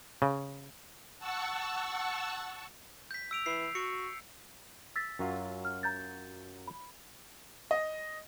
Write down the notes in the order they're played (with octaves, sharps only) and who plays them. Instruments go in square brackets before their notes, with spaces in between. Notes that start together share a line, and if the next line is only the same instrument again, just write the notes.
[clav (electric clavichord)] C#3
[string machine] F#5 A5 C#6 E6
[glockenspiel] G6 B6
E6 D7 F7
[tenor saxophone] E3 [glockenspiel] C7
[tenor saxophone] F#4 [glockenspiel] C#7
[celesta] E6 A6 B6
[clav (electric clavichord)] F#2 F#3 F4
[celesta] F6
A#5 G6 A6
B5
[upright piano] D#5